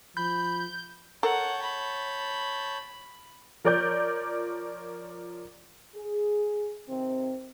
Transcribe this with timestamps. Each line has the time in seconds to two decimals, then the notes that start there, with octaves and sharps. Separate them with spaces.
0.17 F3 B5 G6
1.23 A4 A#4 C#5 F#5 A5 G6
1.62 B5
3.64 F3 A#4 C#5 D5 D6 G6
5.95 G#4
6.88 C3 D#3 C4